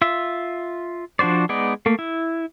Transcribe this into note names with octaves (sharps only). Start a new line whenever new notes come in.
F4 E5
F3 D4 F#4 C5 D5
G#3 B3 D#4 D5
A3 A#3
E4